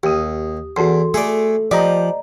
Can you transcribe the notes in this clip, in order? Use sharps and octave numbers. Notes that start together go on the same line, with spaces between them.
D#2 G4 D#6
E2 F#4 A4 C6
A3 G#4 D5
F3 G4 D5 D#5 A#5